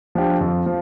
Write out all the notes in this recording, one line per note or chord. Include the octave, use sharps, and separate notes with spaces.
F3 D4 G4
F2
F3